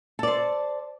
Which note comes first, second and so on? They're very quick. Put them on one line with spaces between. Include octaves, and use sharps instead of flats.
A4 D5 C5